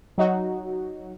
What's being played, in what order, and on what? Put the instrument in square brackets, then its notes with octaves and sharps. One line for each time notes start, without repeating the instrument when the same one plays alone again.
[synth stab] F#3 D#4 F#4